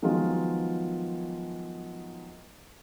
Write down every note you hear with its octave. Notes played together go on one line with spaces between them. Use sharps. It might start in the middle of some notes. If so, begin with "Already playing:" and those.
D#3 F3 F#3 G#3 B3 F4